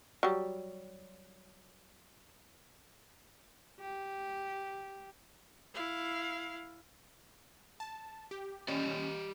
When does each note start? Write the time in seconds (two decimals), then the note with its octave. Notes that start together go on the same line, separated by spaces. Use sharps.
0.23 F#3 G3
3.80 G4
5.74 E4 F5
7.80 A5
8.31 G4
8.68 C#4 G4 D5 D#5